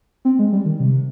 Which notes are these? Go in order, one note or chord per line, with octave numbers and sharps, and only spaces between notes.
C4
G#3
G3
D#3
C3